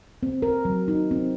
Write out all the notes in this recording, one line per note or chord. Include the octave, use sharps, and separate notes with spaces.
C4
A#4
F#3
D#4
C4